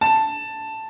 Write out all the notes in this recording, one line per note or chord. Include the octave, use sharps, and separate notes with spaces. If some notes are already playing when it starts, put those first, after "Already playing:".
A5